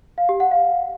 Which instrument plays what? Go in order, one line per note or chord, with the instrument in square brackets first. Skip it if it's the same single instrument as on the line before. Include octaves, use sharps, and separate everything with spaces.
[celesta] F5
G4
F#5
F5